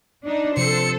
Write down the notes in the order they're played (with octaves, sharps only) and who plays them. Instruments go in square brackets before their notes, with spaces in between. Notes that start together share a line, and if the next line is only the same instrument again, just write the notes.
[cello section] D4 D#4
[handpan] C3 F3 [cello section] A4 C5 [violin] C#7